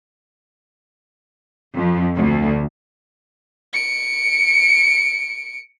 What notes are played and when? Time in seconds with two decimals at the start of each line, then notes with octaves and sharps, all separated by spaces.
1.76 F2
2.17 D2
3.73 C#7 D7